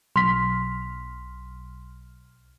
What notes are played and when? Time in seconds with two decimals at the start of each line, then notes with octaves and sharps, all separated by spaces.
0.16 B1 C6 F6 B6